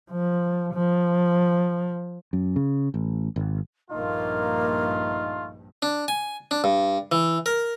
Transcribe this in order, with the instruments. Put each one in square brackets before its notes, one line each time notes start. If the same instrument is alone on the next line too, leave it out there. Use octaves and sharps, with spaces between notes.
[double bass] F3
F3
[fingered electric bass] F#2
C#3
A1
G#1
[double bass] A#1 G2 [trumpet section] A3 F4 [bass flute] A#3 [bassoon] D#4
[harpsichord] D4
G#5
D4
G2
E3
A#4